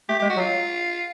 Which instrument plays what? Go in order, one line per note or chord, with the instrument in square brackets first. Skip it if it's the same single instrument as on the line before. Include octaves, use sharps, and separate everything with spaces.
[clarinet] A3 [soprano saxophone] G4
[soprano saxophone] G4
[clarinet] G#3
[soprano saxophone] F#4
[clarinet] F#3
[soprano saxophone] F4